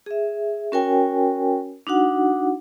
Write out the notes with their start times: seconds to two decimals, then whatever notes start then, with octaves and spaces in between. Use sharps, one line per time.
0.06 G#4 E5
0.72 C#4 F#4 A#4 C#5 G5 G#5
1.87 D4 D#4 F#4 F#5